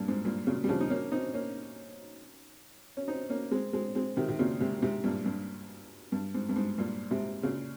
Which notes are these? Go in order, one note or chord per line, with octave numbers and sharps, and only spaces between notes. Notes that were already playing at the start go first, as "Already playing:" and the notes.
Already playing: G2 A#2
G#2
G2 A#2
A#2 C#3
G3
C#3 F3
D#4
A#3 C#4
C4 D#4
A#3 C#4
C#4
C4 D#4
A#3 C#4
G#3 C4
G#3 C4
G#3 C4
C3 D#3
C3
A#2 C#3
G#2 C3
G#2 C3
G2 A#2
G2
G2
G#2
G2
G#2
G2 A#2
G#2 C3
A#2 C#3